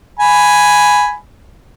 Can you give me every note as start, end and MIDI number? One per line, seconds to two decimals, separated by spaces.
0.19 1.15 80
0.19 1.15 83